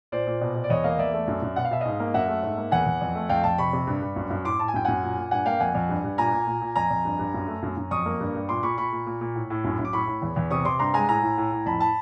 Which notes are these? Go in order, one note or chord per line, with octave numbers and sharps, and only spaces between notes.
A#2 C5 D5
A#2
B2
B2
D5
E2 C#5 D#5
A#3 D#5 F5
E2 D5 E5
A3
F#2
F#2
B2 F#5
F5
B2 E5
G#2 D#5 F5
A#3
F#2 E5 F#5
A3
G#2
A#3
E2 F#5 G#5
E2
F2
A3
F2 F5 G5
F2 G5 A5
C3 B5 C#6
C3
G2
G2
F#2
F#2
A2 C6 D6
A2 A5
G#5
F#2 G5
F#2 F#5 G#5
A#2
A#2
G2 F#5 G#5
A#3 F5 G5
F2 F#5 G#5
F2
G2
G2
A#2 G#5 A#5
A#2
A#2
A#2
F2 G#5 A#5
F2
G2
G2
F#2
A3
F#2
F#2
F2 C#6 D#6
A#3
G2
G2
A#2 C6 D6
A#2 B5 C#6
A#2 B5 C#6
A#2
A#2
A#2
A2
A2
F#2
F#2
D6
A2 B5 C#6
A2
E2
E2
C3 C#6 D#6
C3 C6 D6
G2 A#5 C6
G#3 G#5 A#5
A2 G#5 A#5
A2
A2
A2
F2 A5 B5
A5 B5